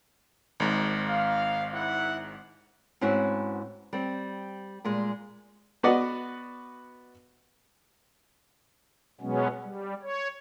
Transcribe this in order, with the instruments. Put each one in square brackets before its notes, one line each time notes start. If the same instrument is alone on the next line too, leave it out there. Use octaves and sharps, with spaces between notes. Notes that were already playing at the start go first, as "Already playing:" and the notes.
[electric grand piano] G#1 G#2
[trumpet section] F5
E4 F#5
[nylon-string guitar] G#2 C4 C#4 E4 F#4 B4
G3 C4
A#2 G3 G#3
[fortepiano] B3 F#4 B4 D5 D#5 F#5
[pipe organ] B2 F#3 G#3 B3 C#4
G3
C#5